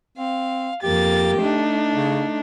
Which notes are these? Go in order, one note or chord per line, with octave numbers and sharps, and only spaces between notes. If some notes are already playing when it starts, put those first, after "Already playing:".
C4 F5
F2 A#3 G4 A6
A3 D4 D#4
C#3